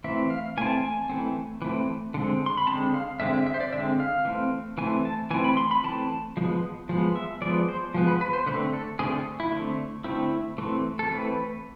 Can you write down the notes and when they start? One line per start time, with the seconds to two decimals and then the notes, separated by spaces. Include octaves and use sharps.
0.04 E3 A3 C4 E5
0.30 F5
0.57 E3 A3 C4 G#5
0.66 A5
0.76 G#5
1.10 E3 A3 C4
1.62 E3 A3 C4
2.14 D3 G#3 C4
2.46 C6
2.57 B5
2.67 D3 G#3 C4 A5
2.94 F5
3.20 D3 G#3 C4 E5
3.33 E5
3.47 E5
3.54 C5
3.60 D5
3.73 D3 G#3 C4 E5
4.00 F5
4.25 E3 A3 C4
4.78 E3 A3 C4 G#5
5.05 A5
5.31 E3 A3 C4 G#5
5.44 B5
5.57 C6
5.71 B5
5.84 E3 A3 C4 A5
6.37 F3 G#3 B3
6.89 F3 G#3 B3
7.16 E5
7.42 F3 G#3 B3 D5
7.68 C5
7.94 F3 G#3 B3
8.07 B4
8.21 B4
8.33 C5
8.47 D3 A3 C4 B4
8.73 A4
8.99 D3 A3 C4 G#4
9.12 A4
9.40 E4
9.52 D3 A3 C4
10.04 D3 A3 C4 E4
10.58 E3 A3 C4
10.99 A4
11.10 E3 A3 C4 B4